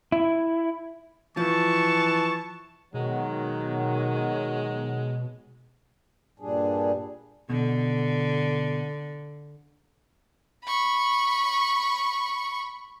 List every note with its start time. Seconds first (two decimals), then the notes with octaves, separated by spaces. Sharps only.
0.12 E4
1.37 E3 F3 A5 C#6
2.94 B2 D#3 F#3 G#3
6.40 G2 A#2 G3 D4 G#4
7.49 B2 D3
10.65 B5 C#6